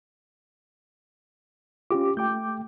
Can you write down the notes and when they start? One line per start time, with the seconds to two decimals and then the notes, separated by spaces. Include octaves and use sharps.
1.91 C#4 F4 G4 D6
2.17 A3 G5 D6 G6